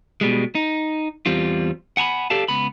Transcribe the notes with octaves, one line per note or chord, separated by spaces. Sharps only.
B2 G3 G#3
D#4
E2 G3 C4 F4
F#5 G#5 A#5 B5
G4 A4 D5 F5 A5
C#2 B3 B5